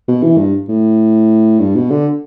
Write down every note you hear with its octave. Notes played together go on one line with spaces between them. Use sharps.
B2
E3
G2
A2
G2
B2
D3